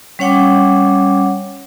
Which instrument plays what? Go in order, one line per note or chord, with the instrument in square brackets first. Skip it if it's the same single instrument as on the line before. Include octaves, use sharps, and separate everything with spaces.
[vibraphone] G3 C#4 C#5 F#5 G5 D6